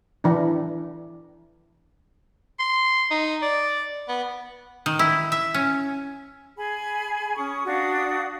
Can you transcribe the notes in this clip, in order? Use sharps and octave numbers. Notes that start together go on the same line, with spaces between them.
E3 D4
C6
D#4
D5
B3
D#3
E4
E5
C#4
G#4 G#5 B5
C#4 C#6 D#6
D4 F#4 F5 D#6